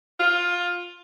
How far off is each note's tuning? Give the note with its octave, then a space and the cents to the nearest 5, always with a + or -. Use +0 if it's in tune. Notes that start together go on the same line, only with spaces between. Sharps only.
F4 +15